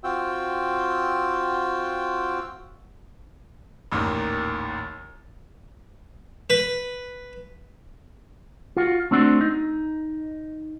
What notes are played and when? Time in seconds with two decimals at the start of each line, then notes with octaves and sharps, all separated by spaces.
0.04 C4 F4 F#4 G5 E6
3.92 A1 D#2 A#2 D#3
6.50 B4
8.77 F4 F#4
9.11 A3 C4 D4 F#4
9.41 D#4